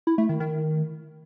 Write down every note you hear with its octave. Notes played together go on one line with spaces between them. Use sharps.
E4
A3
D#3
D#3